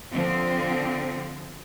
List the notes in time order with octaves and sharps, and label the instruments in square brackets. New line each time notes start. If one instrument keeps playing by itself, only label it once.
[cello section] D3 F3 C4